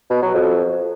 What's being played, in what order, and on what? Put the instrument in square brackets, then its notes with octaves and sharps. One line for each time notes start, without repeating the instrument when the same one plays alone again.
[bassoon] B2
F#3
F2